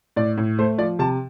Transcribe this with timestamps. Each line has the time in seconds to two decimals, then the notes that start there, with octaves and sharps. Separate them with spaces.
0.16 A2 D5
0.38 A2
0.59 A3 C5
0.78 F3 D5
0.99 C3 A5